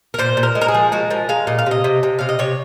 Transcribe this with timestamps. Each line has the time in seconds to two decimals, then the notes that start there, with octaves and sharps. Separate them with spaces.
0.14 A#4
0.19 A#2 C5
0.37 A#2
0.43 A#4
0.55 G#3
0.61 A#4
0.68 G#4
0.74 F3
0.92 G#3 F#4
1.11 F3 A#4
1.29 G#3 F5
1.47 A#2 D#5
1.59 F5
1.66 C3 D#5
1.84 C3
2.03 C3
2.19 C3 F5
2.29 D#5
2.39 C3 C#5